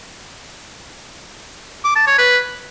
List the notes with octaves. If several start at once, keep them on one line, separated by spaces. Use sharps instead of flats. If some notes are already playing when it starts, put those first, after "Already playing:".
D6
A5
C#5
B4